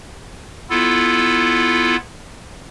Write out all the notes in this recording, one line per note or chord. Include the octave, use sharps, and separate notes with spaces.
B3 E4 F4 A4